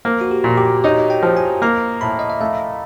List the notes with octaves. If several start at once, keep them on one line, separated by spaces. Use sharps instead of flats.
A#3 C5
F#4
G4
A#2
G4
D#4 C#5
G5
F3
G#5
A#3 A#5
A2 B5
D#5
E5
A3 F5